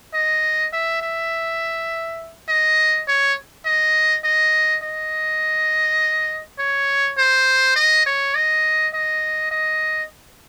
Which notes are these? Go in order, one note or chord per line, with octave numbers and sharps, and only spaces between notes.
D#5
E5
E5
D#5
C#5
D#5
D#5
D#5
C#5
C5
D#5
C#5
D#5
D#5
D#5